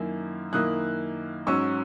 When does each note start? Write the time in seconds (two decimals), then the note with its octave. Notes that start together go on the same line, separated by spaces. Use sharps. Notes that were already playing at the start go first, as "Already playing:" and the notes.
Already playing: F#2 D#3 A#3 E4
0.53 F#2 D#3 A#3 E4 D#6 F#6
1.47 G#2 F#3 C#4 C#6 E6